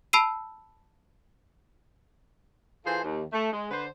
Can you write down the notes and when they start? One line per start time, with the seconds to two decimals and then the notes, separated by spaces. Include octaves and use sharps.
0.13 A5 B5 E6 C7 D#7
2.86 E3 F4 G#4 A4 C5
3.03 D#2
3.32 A3
3.52 G#3
3.71 D3 B4 C5